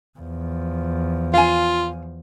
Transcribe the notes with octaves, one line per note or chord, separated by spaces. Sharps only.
E2 F3
F4 F5 G#5